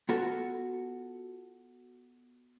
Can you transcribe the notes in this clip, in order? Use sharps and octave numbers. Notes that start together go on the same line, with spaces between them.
B3 F4 F#4 A4